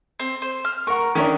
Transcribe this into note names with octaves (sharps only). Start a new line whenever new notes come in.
C4
C5
F6
A#4 F#5 C#6
D#3 C#4 D4 E4 A#4